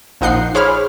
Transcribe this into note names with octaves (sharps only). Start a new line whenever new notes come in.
A#1 F3 D#4 F#5 G6 C7
G#4 C5 C#5 B5 D6 F6